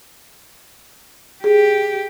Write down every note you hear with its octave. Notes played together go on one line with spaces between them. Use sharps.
G4 G#4